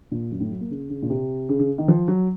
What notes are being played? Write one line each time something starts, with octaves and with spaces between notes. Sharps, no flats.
A#2
F#2
A2
F#3
A#3
C#3
C#3
A#2
C3
C#3
C#3
D#3
F3
F#3